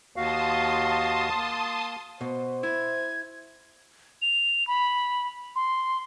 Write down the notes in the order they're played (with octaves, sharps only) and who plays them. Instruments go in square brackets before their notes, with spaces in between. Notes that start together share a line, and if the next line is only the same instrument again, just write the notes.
[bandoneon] D#2 F#4 F5 [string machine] A5 C6 D#6
[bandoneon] A#3
[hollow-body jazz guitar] B2 [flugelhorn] C5
[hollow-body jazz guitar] E4 [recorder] G#6
[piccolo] F7
B5
C6